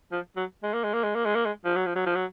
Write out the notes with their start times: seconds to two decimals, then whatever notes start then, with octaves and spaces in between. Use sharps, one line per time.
0.12 F3
0.36 F#3
0.63 G#3
0.73 A#3
0.84 G#3
0.94 A#3
1.03 G#3
1.15 A#3
1.25 G#3
1.35 A#3
1.45 G#3
1.65 F3
1.75 F#3
1.86 F3
1.96 F#3
2.06 F3
2.15 F#3